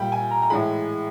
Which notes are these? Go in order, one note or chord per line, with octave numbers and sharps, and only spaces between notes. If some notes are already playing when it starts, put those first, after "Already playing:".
Already playing: A#2 G3 G5 B5
G#5
A#5
A#5
A2 E3 G#3 B5